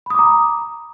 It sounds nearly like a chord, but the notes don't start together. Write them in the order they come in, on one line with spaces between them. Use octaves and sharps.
B5 D#6 D6 A#5